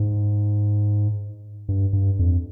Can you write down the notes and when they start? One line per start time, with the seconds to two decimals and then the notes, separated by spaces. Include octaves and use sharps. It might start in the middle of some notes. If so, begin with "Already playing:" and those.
Already playing: G#2
1.69 G2
1.93 G2
2.19 F2